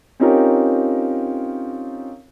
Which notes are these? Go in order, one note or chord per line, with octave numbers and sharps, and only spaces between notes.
C4 C#4 D#4 F4 G4 A#4